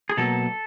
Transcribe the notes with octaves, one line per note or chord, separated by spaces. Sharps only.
G#4
B2 F#3 A#3 A4